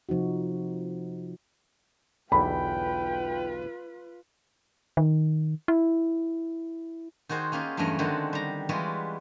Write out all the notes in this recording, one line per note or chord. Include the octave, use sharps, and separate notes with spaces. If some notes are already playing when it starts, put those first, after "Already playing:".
C3 F3 D#4 F#4
B1 E2 D3 F4 B4 G5 B5
D#3
E4
D#3 F#4 G#4 C5
A#3 C#4 F4 G4 G#4
E2 G2 F#3 A3 C#4 D#5
D3 D#3 G#3 C4 F#4 A4
G3 A#5
E3 G3 G#3 B3 F4 F#4